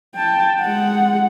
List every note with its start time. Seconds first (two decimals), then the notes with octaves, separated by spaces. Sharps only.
0.15 G5 A5
0.61 G#3 F#5